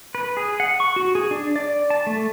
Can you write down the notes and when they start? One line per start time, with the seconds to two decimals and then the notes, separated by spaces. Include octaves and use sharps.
0.15 B4
0.37 G#4
0.60 F#5
0.80 C#6
0.96 F#4
1.15 G#4
1.31 D4
1.56 D5
1.90 A5
2.07 A3